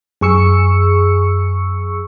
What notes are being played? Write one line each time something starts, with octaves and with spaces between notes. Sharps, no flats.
F#2 G#4 C#6 E6 C#7